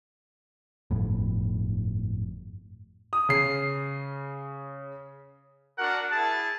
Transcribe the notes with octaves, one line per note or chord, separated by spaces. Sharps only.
G1 F2 A2
D#6
C#3 C7
D4 F#4 A#4 F#5
E4 G#4 A5